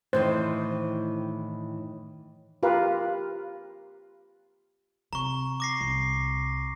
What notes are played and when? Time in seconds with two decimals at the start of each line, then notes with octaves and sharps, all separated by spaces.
0.13 A2 D#3 E3 C5
2.63 F4 G4 A#4 B4 F5
5.13 C3 A#5 C#6
5.60 D6 A#6 C7
5.81 C2